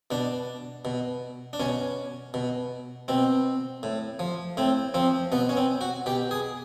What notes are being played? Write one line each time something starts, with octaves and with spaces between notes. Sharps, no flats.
B2 D4
B2
D4
B2 C#4
B2
B2 C4
A2
F3
A2 C4
F3 C4
B2 B3
C#4
C4
F#4
B2 G4
G#4